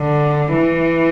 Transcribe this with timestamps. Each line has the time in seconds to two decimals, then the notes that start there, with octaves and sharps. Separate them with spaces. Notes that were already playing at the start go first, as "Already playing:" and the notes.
Already playing: D3
0.53 E3